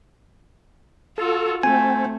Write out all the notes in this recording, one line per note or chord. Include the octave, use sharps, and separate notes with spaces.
F4 F#4 A4
A3 C4 G#5